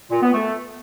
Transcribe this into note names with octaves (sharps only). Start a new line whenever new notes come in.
A#2
B3
A3